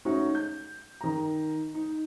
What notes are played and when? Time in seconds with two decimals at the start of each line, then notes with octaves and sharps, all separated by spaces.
0.05 G#3 A3 C#4 D#4 F#4
0.35 G6
1.01 D#3 A#5
1.74 D#4